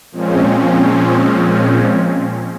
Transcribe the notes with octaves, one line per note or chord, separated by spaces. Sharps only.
A#2 F3 G#3 C4 C#4